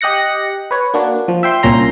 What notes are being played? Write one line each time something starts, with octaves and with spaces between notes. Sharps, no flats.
G4 D#5 F#6 A#6 C#7
B4 C#5
A#3 D4 F#4
F3
E5 G5 C6
C2 A#2 C#4 A#5 C6